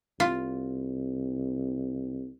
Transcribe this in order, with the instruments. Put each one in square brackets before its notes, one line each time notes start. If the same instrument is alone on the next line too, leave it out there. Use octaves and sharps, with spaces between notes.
[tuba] C2 [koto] F4